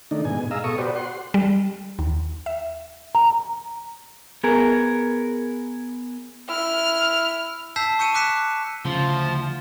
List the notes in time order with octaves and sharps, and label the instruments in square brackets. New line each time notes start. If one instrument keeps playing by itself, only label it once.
[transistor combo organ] D#3 A3 D4 D#4
G#2 B2 G#5
G#4 D#5 F5 A#5 E6
B2 A4 C#6 D#6
F#4 G4 B4 C5 D5
F#5 C6
[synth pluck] G3
D#2
E5
[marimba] A#5
[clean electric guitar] B3 G#4 A#4
[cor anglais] E4 [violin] F6
[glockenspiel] A5 E6 G6 B6 C7
C#6 E6 G6 C#7 D#7 E7
D6 F#6 B6 C#7 E7
[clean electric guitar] D2 C6 [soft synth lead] C#3 [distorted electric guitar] F3